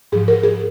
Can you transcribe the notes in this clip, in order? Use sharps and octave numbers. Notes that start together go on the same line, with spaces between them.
G#2 F3 G#4
A#4
G#4